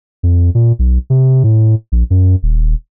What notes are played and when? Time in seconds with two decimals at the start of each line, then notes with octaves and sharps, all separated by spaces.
0.23 F2
0.55 A#2
0.79 B1
1.10 C3
1.44 A2
1.92 A#1
2.10 F#2
2.43 D#1